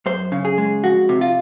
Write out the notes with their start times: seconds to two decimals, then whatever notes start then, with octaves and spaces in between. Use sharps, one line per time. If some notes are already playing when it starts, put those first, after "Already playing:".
0.06 F#2 C5
0.32 C#3
0.45 G#4
0.58 G#3
0.84 F2 F#4
1.09 C3
1.21 F4